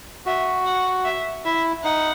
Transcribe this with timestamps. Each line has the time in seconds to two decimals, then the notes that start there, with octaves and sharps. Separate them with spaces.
0.26 F#4 E5
0.66 F#5
1.05 E5
1.45 E4 E5
1.84 D#4 F#5